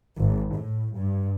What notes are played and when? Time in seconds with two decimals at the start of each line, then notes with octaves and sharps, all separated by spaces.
0.17 G#1
0.55 A2
0.96 G2